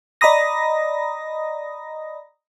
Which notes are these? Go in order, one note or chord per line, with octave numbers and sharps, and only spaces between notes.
D5 D#5 A#5 B5 D#6 A#6